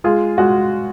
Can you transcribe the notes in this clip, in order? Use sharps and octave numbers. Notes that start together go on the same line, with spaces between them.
G#3 F4 G#4
G#3 F#4